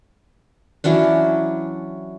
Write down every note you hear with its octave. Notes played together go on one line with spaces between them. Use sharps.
E3 F#3 C#4 D4